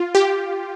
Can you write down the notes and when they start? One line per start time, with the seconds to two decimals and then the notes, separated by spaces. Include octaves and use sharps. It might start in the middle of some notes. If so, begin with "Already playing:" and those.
Already playing: F4
0.15 G4